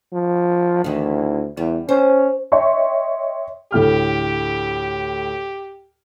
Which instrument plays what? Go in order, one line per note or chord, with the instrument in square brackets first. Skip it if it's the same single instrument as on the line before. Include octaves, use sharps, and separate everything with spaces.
[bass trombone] F3
[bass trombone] D2 [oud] D#3 E3
[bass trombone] E2 [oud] G3
[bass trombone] C#4 [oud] C5
[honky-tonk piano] C#5 D#5 E5 G5 C6 C#6
[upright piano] D2 A2 F6 [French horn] G4